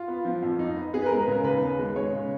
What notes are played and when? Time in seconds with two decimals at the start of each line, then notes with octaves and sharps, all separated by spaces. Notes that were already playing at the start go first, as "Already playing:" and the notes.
Already playing: F4
0.08 B3
0.25 F3
0.43 F2
0.59 D#4
0.77 B3
0.93 B3 G#4
1.02 B4
1.06 A#4
1.11 G#3
1.19 B4
1.27 C#3 A#4
1.44 D#2 B4
1.62 B3
1.79 G#3
1.96 G#3 C#5
2.12 C#3